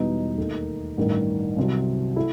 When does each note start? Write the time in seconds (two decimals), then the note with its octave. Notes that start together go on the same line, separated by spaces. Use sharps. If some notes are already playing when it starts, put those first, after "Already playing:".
Already playing: E1 E2 B2 G3 B3 D#4
0.38 D#2 D#3 A3
0.97 A1 G2 D#3
1.56 C2 C3 F#3
2.16 A3 E4